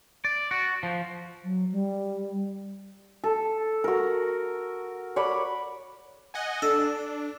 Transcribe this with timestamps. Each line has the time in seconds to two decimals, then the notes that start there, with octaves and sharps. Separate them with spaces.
0.25 D5
0.51 F#4
0.83 F3
1.44 F#3
1.72 G3
3.24 A4
3.84 F#4 A#4
5.16 C#5 D5 F#5 B5
6.34 D#5 F#5 G#5
6.62 D4 A4